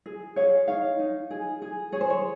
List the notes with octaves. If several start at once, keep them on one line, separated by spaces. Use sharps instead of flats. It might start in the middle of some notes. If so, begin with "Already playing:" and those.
G#4
G#4 C#5 F5
D#4 C#5 F5
D#4
G#4
G#4
G#4 C#5
C5
C#5